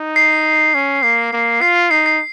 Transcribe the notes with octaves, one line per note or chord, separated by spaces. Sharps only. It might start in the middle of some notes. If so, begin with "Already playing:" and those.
Already playing: D#4
C7
C#4
A#3 C7
A#3
F4 C7
C7
D#4 C7
C7